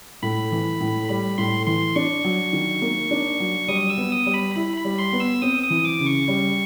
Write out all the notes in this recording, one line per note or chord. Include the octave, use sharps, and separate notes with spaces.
A2 B5
E3
A2
G3 B5
A2 C6
E3 C6
D4 C#6
F#3
D#3
A#3
D4
F#3
G3 D#6
E6
B3
D#6
G3
B5
E4 B5
B5
G3
C6
B3
E6
C4 D#6
D#6
E3
D6
C#3
C#6
G3